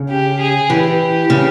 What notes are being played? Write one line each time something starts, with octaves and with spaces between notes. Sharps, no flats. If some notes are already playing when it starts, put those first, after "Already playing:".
Already playing: C#3
G4
G#4
E3 G4
C#3